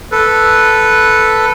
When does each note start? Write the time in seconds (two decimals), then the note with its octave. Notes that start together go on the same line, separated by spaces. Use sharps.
0.12 A4 B4